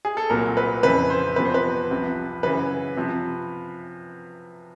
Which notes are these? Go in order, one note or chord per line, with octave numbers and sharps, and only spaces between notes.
G#4
A4
C2 A#2 F#3 A#4
B4
F2 C#3 E3 B4
C5
E2 C3 F3 B4
C5
B4
C2 C3 F3
F#2 C#3 E3 B4
C3 F3